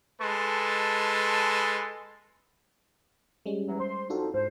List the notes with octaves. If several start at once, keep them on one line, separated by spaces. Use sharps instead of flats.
G#3 A4 B4 A5 C6
G3 G#3 C#4
E2 F#3
C5 C6
F2 F3 D4 D#4 F#4 A4
G#2 C5